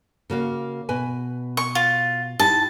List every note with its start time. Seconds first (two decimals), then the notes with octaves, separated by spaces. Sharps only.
0.30 C#3 A#3 F#4
0.89 B2 B4 G#5
1.57 C#6
1.75 F4
2.39 D#4 E4 G4 A5